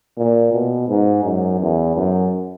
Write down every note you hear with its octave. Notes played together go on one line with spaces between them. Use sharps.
A#2
B2
G#2
F#2
E2
F#2